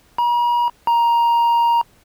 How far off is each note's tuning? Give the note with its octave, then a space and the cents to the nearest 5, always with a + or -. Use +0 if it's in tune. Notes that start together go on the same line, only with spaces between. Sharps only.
A#5 +45
A#5 +10